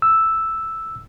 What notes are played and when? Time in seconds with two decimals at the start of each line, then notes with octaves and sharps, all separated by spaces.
0.02 E6